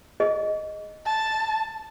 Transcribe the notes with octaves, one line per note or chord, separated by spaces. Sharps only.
G#4 D#5
A5